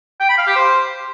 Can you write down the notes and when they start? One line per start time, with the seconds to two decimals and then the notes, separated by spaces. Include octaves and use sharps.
0.20 G5
0.29 B5
0.38 F5
0.47 G4
0.56 C5